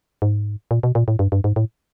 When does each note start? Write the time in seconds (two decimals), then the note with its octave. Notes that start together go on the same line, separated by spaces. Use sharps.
0.22 G#2
0.71 A#2
0.83 B2
0.95 A#2
1.08 A2
1.19 G2
1.32 G2
1.44 G#2
1.56 A2